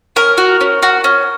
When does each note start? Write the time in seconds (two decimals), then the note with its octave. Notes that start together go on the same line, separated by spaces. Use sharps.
0.16 C#4 A#4
0.38 F#4
0.61 C#4
0.83 F#4
1.04 C#4